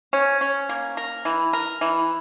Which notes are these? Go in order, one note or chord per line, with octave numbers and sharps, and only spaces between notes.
C#4
C#4
A#3
A#4
E3
A#4
E3